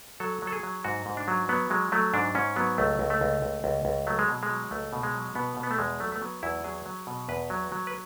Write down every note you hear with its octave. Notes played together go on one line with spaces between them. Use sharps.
F#3 A4
F#3
A4
G#4
F#3
G#2 F#4
G#2
D4
F#3
F#3 B3
F#3 G#3
F#3 A3
G#2 D4
G#2 C#4
F#3 B3
C#2 A3
C#2
A3
C#2
C#2
C#2
C#2
F#3 A3
G#3
B2
G#3
F#3
C#2 A3
B2
G#3
F#3
B2 B3
B2
B3
A3
E2 G#3
F#3 A3
A3
F#3 B3
E2 E4
F#3 G#4
F#3
B2
E2 B4
F#3
F#3
B4